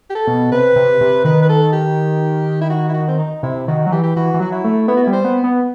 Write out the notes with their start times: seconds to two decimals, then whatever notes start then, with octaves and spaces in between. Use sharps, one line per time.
0.10 G4
0.15 A4
0.27 B2
0.52 C3 B4
0.76 C3
1.01 C3
1.24 D#3 B4
1.42 B4
1.49 A4
1.73 G4
2.61 E4
2.70 F#4
2.89 E4
2.94 F#4
3.08 C4
3.19 D#4
3.43 C3 E4
3.68 D#3 F#4
3.86 F#3
3.92 E3 G4
4.03 G4
4.16 E3 F#4
4.34 E3
4.40 F#3 F#4
4.52 E4
4.64 A3
4.88 B3 E4
4.97 F#4
5.03 G3 E4
5.13 C5
5.24 B3
5.44 B3